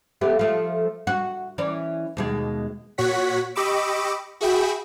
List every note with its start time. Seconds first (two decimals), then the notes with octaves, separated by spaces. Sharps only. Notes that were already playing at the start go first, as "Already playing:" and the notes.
0.21 A3 B3 G4
0.39 F3 A3
1.07 F#4
1.58 E3 C#4 D5
2.17 D#2 B2 G#3
2.98 A#2 F#4 C#5 F#5 B6
3.55 G4 D#5 B5 C#6 D6 E6
4.41 F#4 G#4 E5 G5 B5